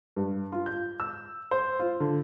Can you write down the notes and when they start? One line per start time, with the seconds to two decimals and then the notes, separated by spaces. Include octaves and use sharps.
0.16 G2
0.52 F4
0.66 G6
1.00 E6
1.51 C5
1.80 F4
2.00 D3